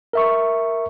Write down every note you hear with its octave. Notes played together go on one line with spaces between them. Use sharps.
A#4 E5 C#6